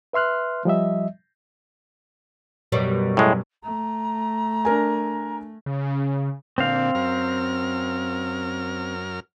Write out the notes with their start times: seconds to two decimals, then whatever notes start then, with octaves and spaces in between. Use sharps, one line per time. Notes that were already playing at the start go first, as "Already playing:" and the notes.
0.13 B4 E5 C6 F6 F#6
0.65 F3 G3 D#5 E5
2.72 F#2 B2 G3
3.17 A2 G#3
3.64 A3 A#5
4.65 D4 A#4 G#5
5.66 C#3
6.58 A#2 D3 C4 F5
6.95 F#2 A#4 F6